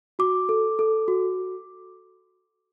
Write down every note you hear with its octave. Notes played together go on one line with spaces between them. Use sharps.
F#4 D6
A4
A4
F#4